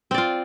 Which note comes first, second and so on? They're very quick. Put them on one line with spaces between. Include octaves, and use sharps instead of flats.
C4 D5 F4